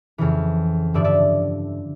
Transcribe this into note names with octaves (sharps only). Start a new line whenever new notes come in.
F2 C#3 E3
G2 D3 F3 D5 E5
D5 E5